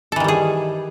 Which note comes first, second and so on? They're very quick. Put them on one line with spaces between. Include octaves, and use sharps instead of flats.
A4 E3 D#3 G3 G#4